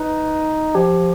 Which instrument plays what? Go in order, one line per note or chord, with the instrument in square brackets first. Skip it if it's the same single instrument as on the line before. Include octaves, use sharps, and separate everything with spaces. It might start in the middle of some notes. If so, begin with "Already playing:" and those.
Already playing: [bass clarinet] D#4 [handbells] B4
[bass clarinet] F3 [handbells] G4